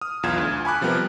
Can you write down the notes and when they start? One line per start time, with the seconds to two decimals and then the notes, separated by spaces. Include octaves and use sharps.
0.01 D#6 F6
0.23 B1 E2 F4 F6 G#6 E7
0.38 D2
0.65 G#5 A5 B5 C#6 D6 F#6
0.81 C3 F3 G3 B3 G4 A#4